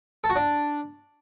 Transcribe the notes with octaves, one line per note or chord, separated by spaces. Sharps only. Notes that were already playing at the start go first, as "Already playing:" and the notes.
A4
F#4
D4